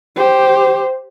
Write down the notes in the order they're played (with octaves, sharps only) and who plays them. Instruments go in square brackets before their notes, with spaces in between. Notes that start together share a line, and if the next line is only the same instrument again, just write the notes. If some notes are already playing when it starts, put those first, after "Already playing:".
[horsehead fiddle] G4 C5